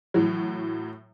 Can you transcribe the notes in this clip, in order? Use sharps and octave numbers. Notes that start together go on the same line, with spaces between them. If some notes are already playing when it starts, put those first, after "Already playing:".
A2 E3 F#3